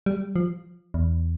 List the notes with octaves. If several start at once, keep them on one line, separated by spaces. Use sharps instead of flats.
G3
F3
E2